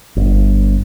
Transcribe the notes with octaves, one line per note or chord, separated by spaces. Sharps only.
G1